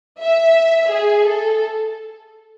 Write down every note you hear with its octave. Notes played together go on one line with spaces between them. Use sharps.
E5
G#4
A4